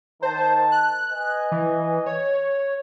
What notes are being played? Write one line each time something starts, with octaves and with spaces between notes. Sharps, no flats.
D#3 C5 A5
F#6
B4 D#5 G#5
E3
C#5